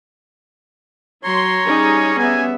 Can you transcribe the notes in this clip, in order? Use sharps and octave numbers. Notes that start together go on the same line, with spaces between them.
F#3 C#5 A#5 C6
G3 C#4 D#4 G#4
B3 E5 G#5